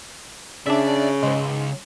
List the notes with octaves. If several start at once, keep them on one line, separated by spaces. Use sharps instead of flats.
C#3 D4 D5 E5
C#2 G#2 G#3